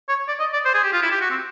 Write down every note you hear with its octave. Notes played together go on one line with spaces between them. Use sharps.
C#5
D5
D#5
D5
C5
G#4
G4
F4
E4
G4
F#4
C4